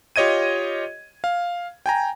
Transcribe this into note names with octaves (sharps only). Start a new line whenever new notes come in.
F4 G4 C#5 D#5 G#6 D#7
F5
G5 G#5 A#5